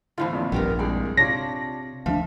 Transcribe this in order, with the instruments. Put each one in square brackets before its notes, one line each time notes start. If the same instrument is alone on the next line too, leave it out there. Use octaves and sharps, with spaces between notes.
[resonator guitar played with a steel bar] E2 A2 D3 [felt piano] F4 C5
[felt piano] F2 A#2
[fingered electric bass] A#1 G2 [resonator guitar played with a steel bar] B3 G4 A#4
[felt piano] C2 G#3 [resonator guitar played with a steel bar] G#4 D5
[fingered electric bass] C3 [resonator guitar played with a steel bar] D4 [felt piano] F4 C#5 [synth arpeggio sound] A#6
[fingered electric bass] D2 E3 D4 [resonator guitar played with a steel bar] F3 E5